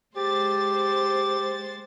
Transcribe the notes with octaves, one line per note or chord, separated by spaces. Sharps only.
G#3 G4 C5 A6